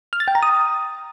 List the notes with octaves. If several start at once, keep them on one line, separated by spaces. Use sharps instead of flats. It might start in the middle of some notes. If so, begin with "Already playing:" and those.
F6
A6
G5
A#5
D#6